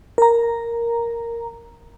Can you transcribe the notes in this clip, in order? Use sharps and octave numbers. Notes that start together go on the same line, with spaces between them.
A#4 A#5